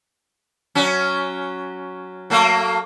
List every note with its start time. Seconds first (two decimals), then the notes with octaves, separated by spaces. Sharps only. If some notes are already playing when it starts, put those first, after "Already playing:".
0.75 F#3 C#4
2.30 F#3 A3 A#3